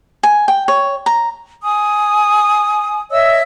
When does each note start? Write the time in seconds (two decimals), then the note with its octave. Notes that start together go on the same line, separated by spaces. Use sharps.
0.23 G#5
0.48 G5
0.68 C#5
1.06 A#5
1.62 G#5 D#6
3.11 C#5 D#5 E5 E6